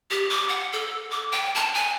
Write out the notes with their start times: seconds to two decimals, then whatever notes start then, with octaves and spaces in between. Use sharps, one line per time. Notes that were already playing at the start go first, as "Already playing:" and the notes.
0.11 G4
0.30 D6
0.49 F#5
0.73 A4
1.11 D6
1.32 G5
1.55 A5
1.75 G#5